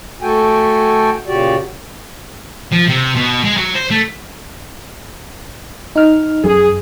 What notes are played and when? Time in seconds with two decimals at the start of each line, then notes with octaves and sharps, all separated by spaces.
0.22 A3 F#4 A4 G5 G#5
1.27 A#2 C#3 F#4 G4 D5
2.72 F3
2.88 C3
3.15 B2
3.43 G#3
3.57 F#3
3.75 C5
3.91 A3
5.96 D#4 F6
6.44 F#2 G#4